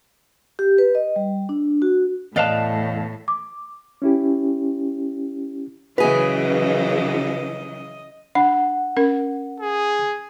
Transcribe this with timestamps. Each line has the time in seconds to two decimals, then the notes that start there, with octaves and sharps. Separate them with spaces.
0.59 G4
0.78 B4
0.95 D#5
1.16 G3
1.49 D4
1.82 F#4
2.36 E2 A2 B4 D5 D#5 F5 A5
3.28 D6
4.02 C#4 E4 G4
5.98 C#3 E3 F#3 F#4 G#4 B4 D#5
8.35 D4 F#5 B5
8.97 C#4 A#4
9.60 G#4